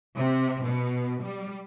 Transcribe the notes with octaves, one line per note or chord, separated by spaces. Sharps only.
C3
B2
G3